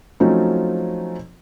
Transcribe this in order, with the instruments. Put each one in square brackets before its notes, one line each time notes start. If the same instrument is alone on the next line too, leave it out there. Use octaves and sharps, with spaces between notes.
[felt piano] F3 F#3 A3 C4 C#4 D#4